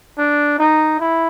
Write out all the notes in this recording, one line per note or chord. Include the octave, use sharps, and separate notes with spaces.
D4
D#4
E4